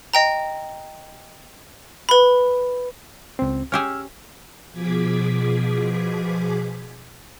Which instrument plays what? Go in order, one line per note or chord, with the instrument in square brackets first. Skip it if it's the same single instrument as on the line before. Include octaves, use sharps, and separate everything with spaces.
[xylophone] D#5 G5 A#5
B4 B5
[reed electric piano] C#2 C4
[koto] C#4 G4 G#4 [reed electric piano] E6 F6
[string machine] B2 F3 G#4 D6 G#6 B6